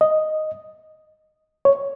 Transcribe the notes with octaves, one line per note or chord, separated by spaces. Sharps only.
D#5
C#5